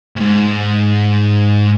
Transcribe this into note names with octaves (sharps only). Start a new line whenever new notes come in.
D2 G#2